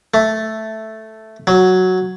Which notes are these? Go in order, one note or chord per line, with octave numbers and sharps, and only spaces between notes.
A3
F#3